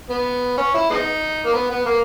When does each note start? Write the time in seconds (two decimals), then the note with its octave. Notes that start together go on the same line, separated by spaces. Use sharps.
0.10 B3
0.58 C#4
0.74 E4
0.90 G#3 B3 D#4
1.46 A#3
1.54 B3
1.70 B3
1.86 A#3